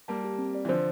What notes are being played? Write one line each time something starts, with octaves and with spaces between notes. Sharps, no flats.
G3 A#3 A5
G4
C4
D5
E3
D3 F3 C5